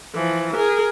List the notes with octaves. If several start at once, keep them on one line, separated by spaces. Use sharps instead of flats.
E3 F3
G#4 A#4